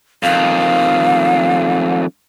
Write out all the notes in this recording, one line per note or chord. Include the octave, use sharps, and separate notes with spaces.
F2 D#3 F5